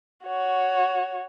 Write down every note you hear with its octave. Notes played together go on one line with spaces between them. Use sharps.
F#4 C#5